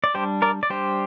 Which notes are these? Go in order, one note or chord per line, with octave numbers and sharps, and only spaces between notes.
D5
G3 D4 G4 C5
A#4 D5
D5
G3 D4 G4 C5